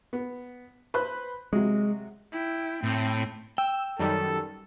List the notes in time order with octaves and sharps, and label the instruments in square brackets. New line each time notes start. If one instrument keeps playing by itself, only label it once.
[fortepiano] B3
B4 C5 F#6
[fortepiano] C3 F#3 [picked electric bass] G#3
[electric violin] E4 G5
[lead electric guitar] A2 [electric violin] C4
[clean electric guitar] G5 [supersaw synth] E6
[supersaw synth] F#2 D#3 G3 [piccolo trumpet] A4